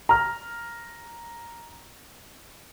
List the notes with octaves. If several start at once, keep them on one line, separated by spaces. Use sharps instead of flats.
A#5 F6